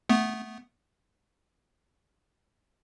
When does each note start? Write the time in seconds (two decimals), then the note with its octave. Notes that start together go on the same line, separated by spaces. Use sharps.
0.09 A3 B3